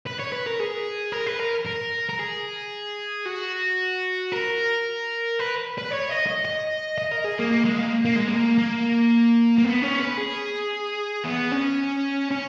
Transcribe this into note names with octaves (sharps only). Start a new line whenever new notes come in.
B4
C#5
B4
A#4
G#4
A#4
B4
A#4
A#4
A#4
G#4
F#4
A#4
B4
B4
C#5
D#5
D#5
D#5
D#5
A#4
G#4
A#3
A#3
G#3
A#3
A#3
G#3
A#3
A#3
A#3
B3
C#4
B4
G#4
B3
C#4
C#4